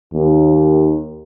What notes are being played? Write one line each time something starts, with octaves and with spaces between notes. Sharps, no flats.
D#2